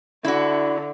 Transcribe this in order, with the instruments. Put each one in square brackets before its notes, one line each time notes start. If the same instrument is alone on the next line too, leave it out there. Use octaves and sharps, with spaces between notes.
[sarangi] D3 [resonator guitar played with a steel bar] E4 F#4